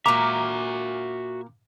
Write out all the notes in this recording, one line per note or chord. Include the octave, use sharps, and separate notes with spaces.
A#2 A#3 F#4 E5 A#5 D6